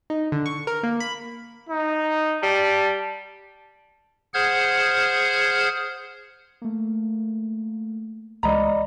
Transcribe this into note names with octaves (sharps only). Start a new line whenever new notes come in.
D#4
D3
C#6
A#4
A#3
B5
D#4
G3 A5
G#4 C5 F#5 F6 G6 G#6
A3 A#3
C#2 E3 G#3 D5 D#5 A#5 B5